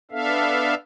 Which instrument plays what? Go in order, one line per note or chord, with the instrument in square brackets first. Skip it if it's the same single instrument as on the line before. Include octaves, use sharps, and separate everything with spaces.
[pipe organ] B3 D4 A4 E5 F5